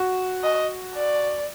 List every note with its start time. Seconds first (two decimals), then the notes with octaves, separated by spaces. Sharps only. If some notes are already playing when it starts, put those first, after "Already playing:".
Already playing: F#4
0.44 D#5
0.95 D5